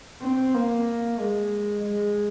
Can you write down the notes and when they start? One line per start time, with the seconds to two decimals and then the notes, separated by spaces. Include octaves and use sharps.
0.21 C4
0.54 A#3
1.18 G#3
1.84 G#3